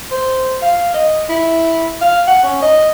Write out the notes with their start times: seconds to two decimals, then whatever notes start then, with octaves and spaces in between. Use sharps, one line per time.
0.11 C5
0.62 F5
0.94 D#5
1.29 E4
2.01 F5
2.27 F#5
2.43 C#4
2.62 D#5